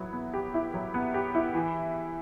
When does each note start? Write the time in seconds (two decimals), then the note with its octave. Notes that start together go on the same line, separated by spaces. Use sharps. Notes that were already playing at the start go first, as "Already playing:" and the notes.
Already playing: F#3 B3 E4
0.13 B3
0.34 G4
0.54 E4
0.74 F#3
0.94 B3
1.14 G4
1.35 E4
1.54 E3